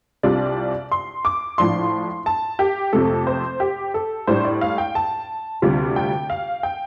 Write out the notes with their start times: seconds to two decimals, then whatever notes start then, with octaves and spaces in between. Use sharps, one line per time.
0.23 C2 C3 G3 D4 F4 D5
0.92 C6
1.25 D6
1.58 A2 F3 D4 C6
2.26 A5
2.59 G4
2.93 F2 C3 A3 A4
3.27 C5
3.60 G4
3.94 A4
4.27 A2 G3 D4 C5
4.45 D5
4.61 F5
4.78 G5
4.95 A5
5.62 D2 C3 G3 F4
5.96 G5
6.30 F5
6.63 G5